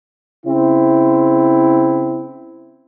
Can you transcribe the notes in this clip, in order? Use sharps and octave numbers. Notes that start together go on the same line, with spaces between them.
C#3 C4 E4